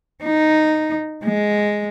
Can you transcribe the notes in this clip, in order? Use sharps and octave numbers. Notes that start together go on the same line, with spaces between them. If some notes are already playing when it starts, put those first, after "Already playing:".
D#4
G#3